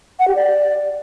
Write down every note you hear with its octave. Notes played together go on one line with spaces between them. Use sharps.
F#5
G4
D5